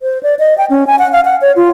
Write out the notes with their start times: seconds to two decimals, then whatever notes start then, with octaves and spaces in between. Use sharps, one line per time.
0.02 C5
0.23 D5
0.39 D#5
0.58 G5
0.70 C#4
0.87 G#5
0.99 F#5
1.12 F5
1.25 F#5
1.41 C#5
1.56 F4